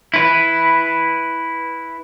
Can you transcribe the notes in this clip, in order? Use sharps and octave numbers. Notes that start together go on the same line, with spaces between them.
E4 B4